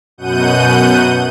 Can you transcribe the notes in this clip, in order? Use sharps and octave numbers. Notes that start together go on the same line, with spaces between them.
F#2 B2 F#5 G6 D#7